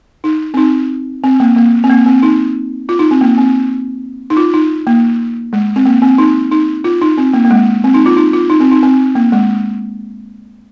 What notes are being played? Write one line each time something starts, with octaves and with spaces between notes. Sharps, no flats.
D#4
C4
D#4
C4
A#3
A#3
C4
A#3
C4
D#4
F4
D#4
C4
A#3
C4
D#4
F4
D#4
A#3
G#3
C4
A#3
C4
D#4
D#4
F4
D#4
C4
A#3
A#3
G#3
C4
D#4
F4
D#4
F4
D#4
C4
D#4
C4
A#3
G#3